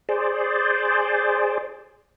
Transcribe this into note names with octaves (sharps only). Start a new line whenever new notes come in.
G#4 C5 D5